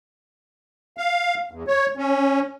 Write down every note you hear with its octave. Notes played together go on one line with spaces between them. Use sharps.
F5
E2
C#5
C#4